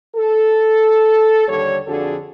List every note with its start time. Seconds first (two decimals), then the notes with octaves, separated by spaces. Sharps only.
0.15 A4
1.48 D#2 D3 G3 C#5
1.87 F2 D3 D4 F#4 G#4 A4